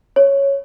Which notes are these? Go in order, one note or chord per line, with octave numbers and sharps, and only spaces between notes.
C#5